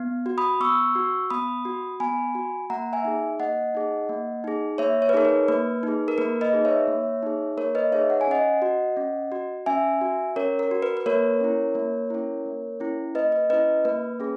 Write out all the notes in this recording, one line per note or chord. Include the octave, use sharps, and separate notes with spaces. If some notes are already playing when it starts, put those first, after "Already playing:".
Already playing: B3
F#4
B5 D#6
B3 C#6 E6
F#4
B3 B5 D#6
F#4
B3 G#5 B5
F#4
A#3 F#5 A#5
E5 G#5
D#4 G#4
A#3 D#5 F#5
D#4 G#4
A#3
D#4 G#4
A#3 C#5 E5
C#5
B4
D#4 G#4 A#4 C#5
B4
A#3 B4
D#4 G#4
A#4
A#3 B4
B4 D#5
D#4 G#4
C#5 E5
A#3
D#4 G#4
A#3 A#4 C#5
B4 D#5
D#4 G#4 C#5 E5
F#5
G#5
C#4 D#5 F#5
F#4
C#4
F#4
C#4 E5 G#5
F#4
C#4 A#4 C#5
A#4
F#4
B4
B4
A#3 A#4 C#5
C#4 E4
A#3
C#4 E4
A#3
C#4 E4
A#3 B4 D#5
B4
C#4 E4 B4 D#5
A#3 B4
C#4 G#4